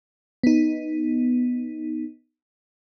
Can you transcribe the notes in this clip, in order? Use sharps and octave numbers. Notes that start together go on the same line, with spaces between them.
B3 D#4